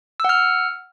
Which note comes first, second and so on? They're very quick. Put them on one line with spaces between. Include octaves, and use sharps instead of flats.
E6 F#5 F6